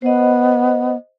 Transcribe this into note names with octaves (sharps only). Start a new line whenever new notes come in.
B3 C5 D#5